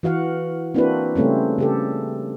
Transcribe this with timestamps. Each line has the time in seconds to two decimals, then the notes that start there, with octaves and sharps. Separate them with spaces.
0.03 E3 F#4 F5 F#5
0.74 A#3 C4 D4 E4 F#4 B4
1.15 C#3 G3 A3 C4 C#4
1.58 C#3 G4 A4